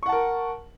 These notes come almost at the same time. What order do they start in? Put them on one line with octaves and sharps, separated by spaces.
C#6 F#5 A5 A#4